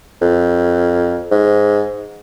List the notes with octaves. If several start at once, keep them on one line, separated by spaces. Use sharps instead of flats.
F2
G#2